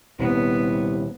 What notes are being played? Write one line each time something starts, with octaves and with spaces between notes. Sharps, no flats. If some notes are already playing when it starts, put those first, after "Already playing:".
D#1 C2 B3